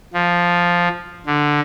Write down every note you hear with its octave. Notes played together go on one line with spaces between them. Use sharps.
F3
D3